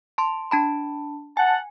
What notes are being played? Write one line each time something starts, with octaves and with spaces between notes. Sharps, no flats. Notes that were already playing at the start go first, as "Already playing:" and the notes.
A5 C6
D4 A5 B5
F#5 G#5 A5